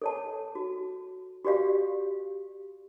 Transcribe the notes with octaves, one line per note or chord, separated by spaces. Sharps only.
A4 C#5 A5
F#4
F#4 G4 D5 F5